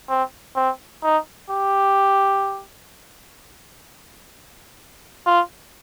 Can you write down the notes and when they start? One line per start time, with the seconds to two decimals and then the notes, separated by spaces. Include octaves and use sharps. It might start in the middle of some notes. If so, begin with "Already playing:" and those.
0.09 C4
0.56 C4
1.03 D#4
1.50 G4
5.26 F4